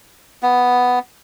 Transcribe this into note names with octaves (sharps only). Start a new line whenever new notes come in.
B3